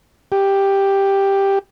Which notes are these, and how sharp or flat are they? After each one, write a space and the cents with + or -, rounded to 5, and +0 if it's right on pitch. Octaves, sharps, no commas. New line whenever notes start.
G4 +5